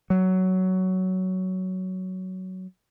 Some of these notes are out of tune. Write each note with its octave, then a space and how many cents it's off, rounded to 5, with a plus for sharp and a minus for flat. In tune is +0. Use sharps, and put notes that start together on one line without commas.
F#3 +10